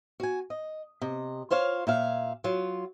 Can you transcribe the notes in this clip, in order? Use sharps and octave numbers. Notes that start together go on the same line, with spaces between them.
F#4 G#5
D#5
C3 D#5
F4 C5 C#5 F5
A#2 E5 F5
F#3 F4